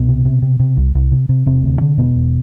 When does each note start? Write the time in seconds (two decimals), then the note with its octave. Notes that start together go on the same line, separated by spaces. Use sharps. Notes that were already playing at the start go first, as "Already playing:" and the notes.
Already playing: C2 B2 B3
0.08 C3
0.25 C3
0.42 C3
0.60 C3
0.77 C2
0.95 C2
1.12 C3
1.29 C3
1.46 E1 C3 C4
1.63 D2
1.81 D3
1.98 E1 B2 B3
2.15 E1